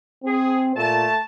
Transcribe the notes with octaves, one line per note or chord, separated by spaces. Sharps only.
C4 G#4
A#2 A3 A5